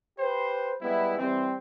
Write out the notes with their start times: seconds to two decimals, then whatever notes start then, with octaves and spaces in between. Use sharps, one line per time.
0.18 G4 B4 C5
0.81 G3 G#3 B3 E4
1.18 E3 G3 C4